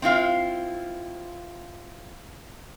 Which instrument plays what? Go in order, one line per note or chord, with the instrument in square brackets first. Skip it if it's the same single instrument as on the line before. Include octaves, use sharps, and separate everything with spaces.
[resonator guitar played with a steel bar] C4 E4 F4 F5